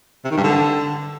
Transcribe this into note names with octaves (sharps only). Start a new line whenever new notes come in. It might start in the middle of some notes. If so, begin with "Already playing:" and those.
C3
D#3
G2
D3